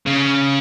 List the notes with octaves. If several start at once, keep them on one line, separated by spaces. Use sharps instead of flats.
C#3